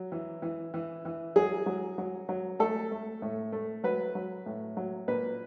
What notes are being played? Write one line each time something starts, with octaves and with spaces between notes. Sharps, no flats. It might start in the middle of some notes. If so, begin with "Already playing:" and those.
Already playing: F#3
E3
E3
E3
E3
F#3 G#4
F#3
F#3
F#3
A3 A4
A3
A2
A3
F#3 B4
F#3
A2
F#3
A#2 B4